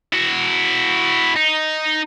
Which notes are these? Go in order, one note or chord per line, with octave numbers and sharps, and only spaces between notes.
E4 F#4
D#4